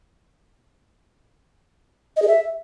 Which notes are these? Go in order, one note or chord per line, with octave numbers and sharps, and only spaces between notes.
D#5
G#4
E5